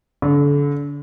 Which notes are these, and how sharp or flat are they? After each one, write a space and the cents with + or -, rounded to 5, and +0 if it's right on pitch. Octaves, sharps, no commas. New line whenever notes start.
D3 -35